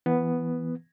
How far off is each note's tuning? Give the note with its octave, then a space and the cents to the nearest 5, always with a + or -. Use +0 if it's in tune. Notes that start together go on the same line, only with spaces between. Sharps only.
E3 +5 B3 +0